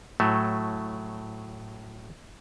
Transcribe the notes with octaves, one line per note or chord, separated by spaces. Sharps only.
A2 F#3 A3